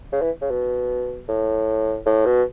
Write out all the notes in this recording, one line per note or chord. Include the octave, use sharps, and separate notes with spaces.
C#3
E3
C#3
B2
A2
A2
B2